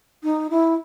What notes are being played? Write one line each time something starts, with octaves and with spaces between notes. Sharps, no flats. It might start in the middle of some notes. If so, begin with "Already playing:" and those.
D#4
E4